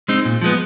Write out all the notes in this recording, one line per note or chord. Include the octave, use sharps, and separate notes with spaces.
G#3 C4 D#4
A#2
F3 G#3 B3